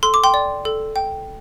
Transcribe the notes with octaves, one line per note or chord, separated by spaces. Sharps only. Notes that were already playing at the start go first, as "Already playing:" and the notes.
A4 C6
D6
G5 C6
D5
A4
G5